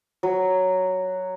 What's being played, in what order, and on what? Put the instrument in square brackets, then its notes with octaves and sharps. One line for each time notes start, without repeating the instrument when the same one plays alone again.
[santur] F#3